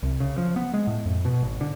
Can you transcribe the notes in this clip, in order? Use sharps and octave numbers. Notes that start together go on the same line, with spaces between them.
C2
C#3
F3
B3
G#3
A2
F2
B2
G#1
D3